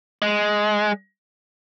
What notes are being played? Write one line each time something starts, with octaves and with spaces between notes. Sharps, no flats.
G#3